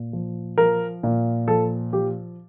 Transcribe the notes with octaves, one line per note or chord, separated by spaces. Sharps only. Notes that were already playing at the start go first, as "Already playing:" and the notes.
Already playing: A#2
F3
F3 A#4
A#2
F3 A4
F3 G4